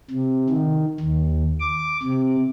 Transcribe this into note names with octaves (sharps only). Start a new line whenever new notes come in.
C3
D#3
D#2
D6
C3